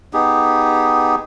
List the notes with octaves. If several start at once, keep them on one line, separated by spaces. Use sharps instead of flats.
B3 D#4 G4 G#4